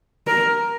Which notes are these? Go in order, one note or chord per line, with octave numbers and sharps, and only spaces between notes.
A#4